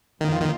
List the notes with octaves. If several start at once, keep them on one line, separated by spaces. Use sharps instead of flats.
F2 D#3 F3 A#3 F4
D#3